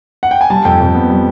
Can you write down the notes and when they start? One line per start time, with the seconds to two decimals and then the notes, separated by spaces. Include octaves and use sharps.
0.23 F#5
0.31 G5
0.41 G#5
0.50 G3 A5
0.65 F2 G5
0.80 F2
0.95 B3
1.10 G3